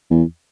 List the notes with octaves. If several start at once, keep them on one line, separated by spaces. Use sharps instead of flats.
E2